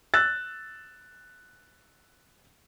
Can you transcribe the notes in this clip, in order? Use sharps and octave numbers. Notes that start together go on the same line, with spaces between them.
E6 F#6 A6